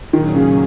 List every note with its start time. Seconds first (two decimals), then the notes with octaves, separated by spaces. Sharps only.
0.13 A#2 D#3 F#3 C#4 G#4
0.35 C#3